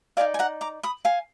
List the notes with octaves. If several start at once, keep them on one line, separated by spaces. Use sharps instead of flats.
D#4 A#4 D5 F5 G#5
G#5
F#5 A#5
A#5 D6
B5 D#6
F5 G#5